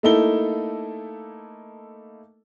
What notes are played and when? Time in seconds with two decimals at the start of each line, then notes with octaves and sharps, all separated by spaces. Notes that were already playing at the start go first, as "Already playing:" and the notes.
0.03 A3 A#3 D#4 E4 A4 G7